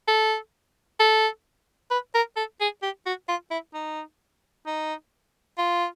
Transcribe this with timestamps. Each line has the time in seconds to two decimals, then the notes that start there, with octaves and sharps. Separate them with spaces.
0.08 A4
1.00 A4
1.91 B4
2.15 A#4
2.36 A4
2.60 G#4
2.82 G4
3.06 F#4
3.28 F4
3.51 E4
3.74 D#4
4.66 D#4
5.58 F4